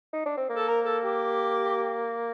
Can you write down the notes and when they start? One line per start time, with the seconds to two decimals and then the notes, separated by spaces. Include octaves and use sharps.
0.13 D#4
0.26 D4
0.37 C4
0.49 A#3
0.56 A4
0.68 A#4
0.85 A4
1.03 G4